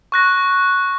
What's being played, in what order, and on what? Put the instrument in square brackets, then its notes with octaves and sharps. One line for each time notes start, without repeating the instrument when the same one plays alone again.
[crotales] C#6 F#6 A#6